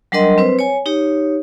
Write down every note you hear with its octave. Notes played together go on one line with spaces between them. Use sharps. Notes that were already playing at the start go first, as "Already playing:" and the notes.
F#3 G3 D4 A#4 D#5 C6
C4 B4 C5
C#5 G#5
D#4 G4 C#5